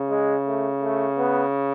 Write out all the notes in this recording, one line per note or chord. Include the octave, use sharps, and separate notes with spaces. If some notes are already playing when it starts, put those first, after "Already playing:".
Already playing: C#3
G#3
A3
A3
B3